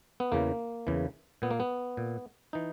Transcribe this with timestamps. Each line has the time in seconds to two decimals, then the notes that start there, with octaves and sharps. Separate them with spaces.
0.20 B3
0.32 E2 C#3 E3 A#3
0.87 E2 C#3 E3
1.42 A#2 B3
1.51 A#3
1.60 B3
1.97 A#2
2.53 E3 D#4